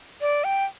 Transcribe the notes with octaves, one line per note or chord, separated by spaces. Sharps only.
D5
G5